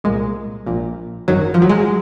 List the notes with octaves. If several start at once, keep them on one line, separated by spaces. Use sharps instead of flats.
C2 A#2 G#3
A#1 A#2
G#1 F#2 D#3 F#3
F3
F#3
G#3